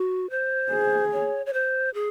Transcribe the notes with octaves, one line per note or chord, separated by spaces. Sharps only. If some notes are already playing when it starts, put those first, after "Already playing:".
Already playing: F#4
C5
G#4
C#5
C#5
C5
G#4